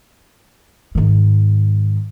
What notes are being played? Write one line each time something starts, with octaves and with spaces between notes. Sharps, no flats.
G#2 D#3